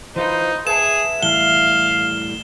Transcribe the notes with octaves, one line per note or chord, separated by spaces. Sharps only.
E3 D#4 F4 B4 C5
G#4 B4 E5 A5 E7
A2 E3 G3 F5 G7